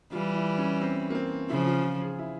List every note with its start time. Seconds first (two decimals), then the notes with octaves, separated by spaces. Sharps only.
0.12 E3 G3 F4
0.36 E4
0.58 C#4
0.81 C4
1.10 A#3
1.15 C4
1.49 C#3 F3 E4
1.66 F4
1.83 F4
2.01 G#4
2.19 E4